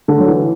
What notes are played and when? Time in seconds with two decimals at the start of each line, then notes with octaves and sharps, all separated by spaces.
0.08 D3
0.20 F#3
0.28 E3